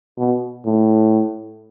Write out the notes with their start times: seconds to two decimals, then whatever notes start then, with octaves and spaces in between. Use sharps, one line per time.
0.18 B2
0.66 A2